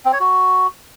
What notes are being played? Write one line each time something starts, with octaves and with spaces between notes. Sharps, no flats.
C4
C#5
F#4